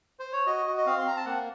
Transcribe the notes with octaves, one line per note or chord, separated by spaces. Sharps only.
C5
C#5
F#4 D#5
F#4
D#5
C4 F5
C6
C4 A#5
A5
A#3 F#5